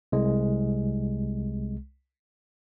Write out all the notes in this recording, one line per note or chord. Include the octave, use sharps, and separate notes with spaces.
C2 G#3